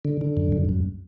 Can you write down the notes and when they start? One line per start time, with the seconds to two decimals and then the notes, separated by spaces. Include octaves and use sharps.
0.05 D3
0.21 D3
0.37 F#2
0.52 F#2
0.69 F#2